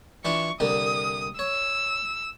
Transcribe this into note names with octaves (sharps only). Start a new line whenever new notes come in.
E3 D4 F4 C#6
C2 D3 A#3 D#6
C#5 E6